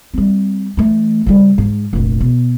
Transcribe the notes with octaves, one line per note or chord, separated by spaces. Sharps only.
G3 C4
E3 A3
C#3 G3
G#2
F1 A#1
B2